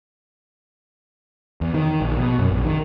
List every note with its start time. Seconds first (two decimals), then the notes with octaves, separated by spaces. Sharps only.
1.61 E2
1.74 D#3
2.01 A#1
2.18 B2
2.39 F#2
2.51 A#1
2.65 D#3